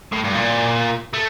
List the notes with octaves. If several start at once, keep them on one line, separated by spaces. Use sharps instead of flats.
A2
G2
A#2
A3